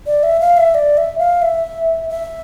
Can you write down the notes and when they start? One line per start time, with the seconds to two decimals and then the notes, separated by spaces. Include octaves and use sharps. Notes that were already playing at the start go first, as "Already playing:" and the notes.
0.06 D5
0.23 E5
0.41 F5
0.57 E5
0.75 D5
0.97 E5
1.19 F5
1.42 E5
2.10 E5